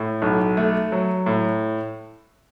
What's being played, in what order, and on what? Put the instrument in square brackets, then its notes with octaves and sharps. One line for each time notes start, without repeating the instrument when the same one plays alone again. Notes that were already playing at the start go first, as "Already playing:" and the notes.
Already playing: [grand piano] A2
B1
A3
F#3
A2